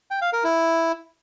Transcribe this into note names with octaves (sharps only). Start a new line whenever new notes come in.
G5
F5
A#4
E4